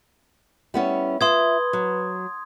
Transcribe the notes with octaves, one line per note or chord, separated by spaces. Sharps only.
G3 B3 C#4 E4
F4 B4 E5 C6 D#6 G#6
F#3